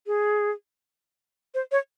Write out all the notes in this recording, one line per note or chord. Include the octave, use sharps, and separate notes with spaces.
G#4
C5
C#5